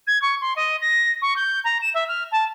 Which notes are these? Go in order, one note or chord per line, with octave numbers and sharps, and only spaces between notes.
G#6
C#6
C6
D#5
A#6
C#6
G6
A#5
E7
E5
F6
A5